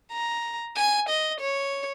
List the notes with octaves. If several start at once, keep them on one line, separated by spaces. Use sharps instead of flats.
A#5
G#5
D#5
C#5